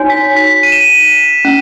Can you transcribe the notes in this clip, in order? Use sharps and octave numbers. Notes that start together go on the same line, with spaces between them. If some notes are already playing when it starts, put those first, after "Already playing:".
Already playing: D#4 F#4 C#5 G#5
B6
B6
D#7
E7
D#7
C#4